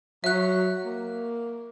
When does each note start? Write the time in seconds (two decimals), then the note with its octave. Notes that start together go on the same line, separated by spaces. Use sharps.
0.24 F#3 E5 F#6
0.85 A#3